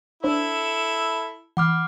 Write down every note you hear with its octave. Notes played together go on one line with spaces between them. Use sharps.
D4 E4 A4 C5 B5
E3 F#5 B5 D6 F6